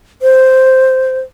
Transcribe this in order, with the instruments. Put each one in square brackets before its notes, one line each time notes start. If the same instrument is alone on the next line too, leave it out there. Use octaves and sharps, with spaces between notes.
[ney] C5